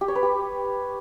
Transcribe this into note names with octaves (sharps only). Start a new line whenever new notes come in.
G4
C#5
B4
G4